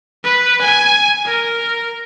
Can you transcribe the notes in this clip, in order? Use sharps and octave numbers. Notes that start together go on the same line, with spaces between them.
B4
G#5
A#4